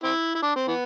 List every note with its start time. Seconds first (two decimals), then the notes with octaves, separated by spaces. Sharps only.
0.04 C4 E4
0.35 E4
0.42 D4
0.56 C4
0.68 E3 B3